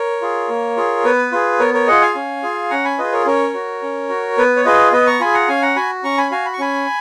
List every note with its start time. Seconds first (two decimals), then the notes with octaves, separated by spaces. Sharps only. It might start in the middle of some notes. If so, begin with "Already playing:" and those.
Already playing: A#4 C#5
0.22 F4 G#4
0.49 A#3
0.77 F4 G#4
1.05 B3 B4
1.32 F4 G#4
1.59 B3 A#4 C#5
1.74 A#4 C#5
1.87 F4 G#4 D#5 F#5
2.01 F5 G#5
2.15 C#4
2.43 F4 G#4
2.70 C#4 F#5 A#5
2.85 G#5 B5
2.99 F4 G#4 B4 D#5
3.12 A#4 C#5
3.26 C#4 A#4 C#5
3.54 F#4
3.82 C#4
4.09 F#4
4.37 B3 B4
4.56 C#5
4.65 F4 G#4 B4 D#5
4.92 B3 B4 D#5
5.07 A#5 C#6
5.20 F4 G#4 G#5 B5
5.34 F#5 A#5
5.48 C#4 F5 G#5
5.62 F#5 A#5
5.76 F#4 G#5 B5
6.04 C#4 A#5 C#6
6.18 G#5 B5
6.31 F#4 F5 G#5
6.46 B5
6.53 C#6
6.59 C#4 G#5 B5